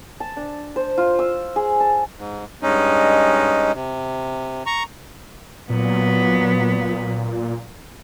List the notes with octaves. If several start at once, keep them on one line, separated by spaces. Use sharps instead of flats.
A5
D4
C5
F4
E6
G#4
A5
G#2
G2 G#3 C#4 D#4
C3
A#5 C#6
A#2 F#3 B3